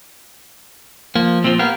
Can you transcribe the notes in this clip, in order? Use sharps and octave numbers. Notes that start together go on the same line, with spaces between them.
F3 A#3
A#2 F3 C4
A#3 B3 G4 A#4 F5